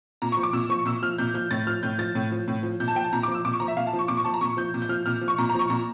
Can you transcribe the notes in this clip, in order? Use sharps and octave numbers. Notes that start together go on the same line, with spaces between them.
A#2 A#5
C#6
F3
D6
A#2 E6
F3 C#6
A#2 E6
F3 F6
A#2 G6
F3 G6
A2 A6
F3 F6
A2 G6
F3 A6
A2
F3
A2
F3
A#2 G6
A5
F3 G5
A5
A#2 A#5
D6
F3
E6
A#2 D6
C#6
F3 A#5
E5
A#2 F5
A5
F3
C#6
A#2 D6
C#6
F3 A5
A#5
A#2 C#6
F3 G6
A#2
G6
F3 F6
A#2 F6
F3
C#6
A#2 A#5
A#5
F3 C#6
A#2 A#5